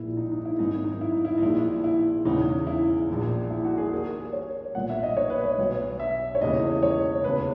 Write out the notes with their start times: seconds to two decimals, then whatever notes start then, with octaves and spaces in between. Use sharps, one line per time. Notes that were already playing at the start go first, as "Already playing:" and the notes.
Already playing: A#1 A#2 E4
0.17 D#4
0.32 D#4
0.45 E4
0.59 G#1 F#2 D#3 D#4
0.84 D#4
1.01 E4
1.12 D#4
1.25 E4
1.38 D#4
1.42 A#1 A#2 E4
1.84 E4
2.25 E1 E2 C#3 E3 D#4
2.67 E4
3.09 A#1 A#2
3.50 E4
3.65 F#4
3.77 G#4
3.92 D#2 D#3 A#4
4.33 C#5
4.75 B1 A#2 F#5
4.89 E5
5.03 D#5
5.17 C#5
5.30 B4
5.44 C#5
5.58 B1 B2
6.00 E5
6.35 C#5
6.41 E1 D#2 C#3 E3 D#5
6.83 C#5
7.24 E1 D#2 C#3 B4